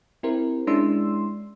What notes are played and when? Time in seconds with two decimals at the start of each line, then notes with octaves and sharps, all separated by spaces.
0.23 C4 E4 G4 A#4 C5
0.67 G#3 C#4 D4 E4 C6 E6